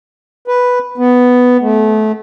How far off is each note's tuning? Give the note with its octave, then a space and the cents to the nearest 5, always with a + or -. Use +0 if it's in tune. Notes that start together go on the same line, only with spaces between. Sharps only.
B4 +0
B3 +5
A3 -25